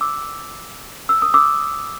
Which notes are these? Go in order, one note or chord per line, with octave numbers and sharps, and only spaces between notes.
D6 E6
E6
D#6
D6 E6